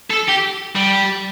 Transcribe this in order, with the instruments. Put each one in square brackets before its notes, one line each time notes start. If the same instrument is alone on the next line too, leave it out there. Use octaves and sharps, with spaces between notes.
[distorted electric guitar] A4
G4
G3